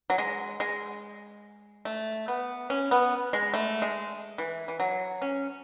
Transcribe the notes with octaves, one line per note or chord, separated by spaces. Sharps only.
F#3
G#3
G#3
A3
B3
C#4
B3
G#3
A3
G#3
E3
E3
F#3
C#4